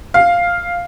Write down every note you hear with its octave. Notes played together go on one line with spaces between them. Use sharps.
F5